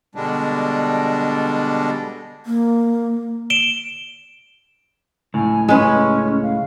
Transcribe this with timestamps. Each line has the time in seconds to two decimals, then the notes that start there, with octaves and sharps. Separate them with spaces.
0.15 B2 D3 G3 G#3 D4
2.46 A#3
3.50 D7 E7 G7
5.34 C#2 A2 G#5
5.68 G#3 C#4 B4
6.42 F5